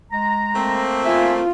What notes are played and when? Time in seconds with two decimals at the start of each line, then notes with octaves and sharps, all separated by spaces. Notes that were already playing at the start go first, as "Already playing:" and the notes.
0.12 G#3 A#5
0.56 A3 A#3 C4
1.05 F4 E5 G#5